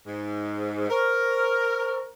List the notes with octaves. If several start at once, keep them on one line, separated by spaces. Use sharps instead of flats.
G#2
A#4 C5 C#6